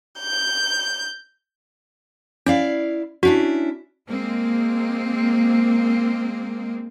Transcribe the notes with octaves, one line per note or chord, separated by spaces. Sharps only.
G6
C#4 E4 D5 F5
C#4 D4 E4 F#4
G#3 A#3 C4